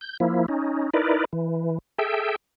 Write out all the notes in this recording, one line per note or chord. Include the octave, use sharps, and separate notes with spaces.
G6
F3 A#3 E4
C#4 D#4
D#4 E4 A#4 B4 D5
E3
G#4 A4 E5 G5